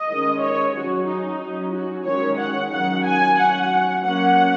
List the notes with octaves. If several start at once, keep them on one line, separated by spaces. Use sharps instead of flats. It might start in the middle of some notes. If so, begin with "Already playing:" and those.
Already playing: D#5
D#3 G#3 C#4
C#5
F#3 C#4 F#4
D#4
F#3 C#4
F#4
D#3 G#3 C#4 C#5
F#5
D#3 F#3 C#4 F#5
G#5
F#3 C#4 F#5
F#3 A#3 C#4 F#5